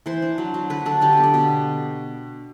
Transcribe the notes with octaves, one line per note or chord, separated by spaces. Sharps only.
E3 C5
D4
F#3
F#3
D3 B4
D4 A4
D3 G4
B3 B4
G4
B2